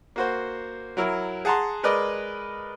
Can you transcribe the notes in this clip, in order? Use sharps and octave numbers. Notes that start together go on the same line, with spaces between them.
A#3 F#4 C5
F#3 E4 A#4
G#4 F#5 A5 A#5 C6
G#3 A#4 B4 D5 D#5